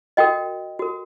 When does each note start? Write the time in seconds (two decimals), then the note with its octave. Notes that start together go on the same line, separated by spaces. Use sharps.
0.17 F#4 A#4 D#5 G5
0.79 F#4 A#4